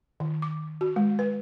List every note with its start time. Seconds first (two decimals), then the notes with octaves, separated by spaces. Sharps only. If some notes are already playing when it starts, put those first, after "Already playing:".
0.20 D#3
0.42 D6
0.81 F#4
0.96 G#3
1.19 B4